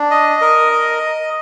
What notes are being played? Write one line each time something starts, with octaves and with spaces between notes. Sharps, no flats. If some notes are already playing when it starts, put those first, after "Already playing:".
Already playing: D4
D#5
A#4
D#5